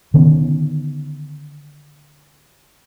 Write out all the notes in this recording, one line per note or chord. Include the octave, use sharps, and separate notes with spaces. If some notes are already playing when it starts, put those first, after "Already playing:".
D3 D#3 B3 C#4